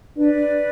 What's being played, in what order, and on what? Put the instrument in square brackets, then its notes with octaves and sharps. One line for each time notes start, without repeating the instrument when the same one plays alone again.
[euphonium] D4 [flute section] B4 D5